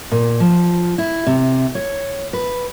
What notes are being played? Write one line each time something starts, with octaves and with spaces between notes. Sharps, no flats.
A#2
F3
E4
C3
C#5
B4